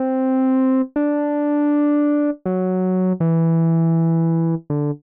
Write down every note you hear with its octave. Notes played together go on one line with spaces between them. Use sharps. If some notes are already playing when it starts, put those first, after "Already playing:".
Already playing: C4
D4
F#3
E3
D3